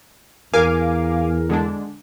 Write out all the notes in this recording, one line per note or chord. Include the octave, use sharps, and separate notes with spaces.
E2 A#4 F5 G#5 D6
D3 G#3 D4